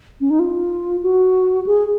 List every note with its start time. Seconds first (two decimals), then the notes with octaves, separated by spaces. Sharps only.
0.20 C#4
0.30 D#4
0.39 F4
1.03 F#4
1.66 G#4